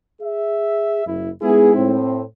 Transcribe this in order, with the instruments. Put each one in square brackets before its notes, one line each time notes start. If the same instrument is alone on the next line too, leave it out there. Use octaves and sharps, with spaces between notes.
[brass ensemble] G#4 E5
F#1 E4
[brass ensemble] G#3 D#4 E4 [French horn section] B3 G#4
[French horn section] A2 C4